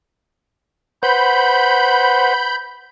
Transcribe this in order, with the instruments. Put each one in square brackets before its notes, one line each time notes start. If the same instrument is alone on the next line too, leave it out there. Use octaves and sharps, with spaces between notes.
[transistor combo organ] B4 C5 F#5 [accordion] B5 G6